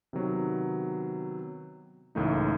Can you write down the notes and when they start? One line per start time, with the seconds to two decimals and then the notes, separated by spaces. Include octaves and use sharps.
0.13 C3 D#3 F#3 B3
2.15 C#2 A2 E3 A3 A#3 D#4